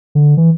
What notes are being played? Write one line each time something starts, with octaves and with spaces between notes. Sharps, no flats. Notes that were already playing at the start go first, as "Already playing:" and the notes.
D3
E3